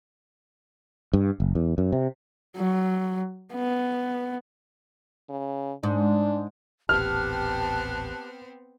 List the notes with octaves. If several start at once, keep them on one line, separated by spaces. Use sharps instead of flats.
G2
F#1
E2
F#2
C3
F#3
B3
C#3
G#2 D4
D#1 A1 B3 C4 G4 A5 F6 F#6